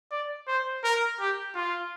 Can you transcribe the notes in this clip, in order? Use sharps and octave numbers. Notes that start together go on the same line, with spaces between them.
D5
C5
A#4
G4
F4